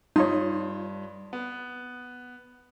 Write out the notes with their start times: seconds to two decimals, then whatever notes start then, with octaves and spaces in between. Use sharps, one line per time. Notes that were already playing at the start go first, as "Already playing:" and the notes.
0.16 G2 D#4 F4 C#5 C6 D#6
1.33 B3